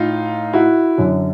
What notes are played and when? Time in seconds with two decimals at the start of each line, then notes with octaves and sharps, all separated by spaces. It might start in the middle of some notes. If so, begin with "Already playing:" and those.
Already playing: A2 D#4 F4
0.53 E4 F#4
0.98 F#2 D3 F#3